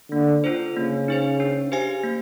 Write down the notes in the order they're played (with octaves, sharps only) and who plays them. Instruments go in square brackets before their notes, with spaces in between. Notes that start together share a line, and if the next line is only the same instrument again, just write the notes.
[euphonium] D3 [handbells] A#3
[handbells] D4 F4 A4 C5
[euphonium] C#3 [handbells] A#3
[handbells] D#4 G#4 C5
D4
G4 C5 F5 G#5
A#3